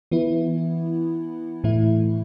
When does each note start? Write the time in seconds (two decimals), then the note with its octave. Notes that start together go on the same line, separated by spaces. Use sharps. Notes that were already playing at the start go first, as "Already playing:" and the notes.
0.11 E3 B3 E4
1.64 A2 E3 A3 E4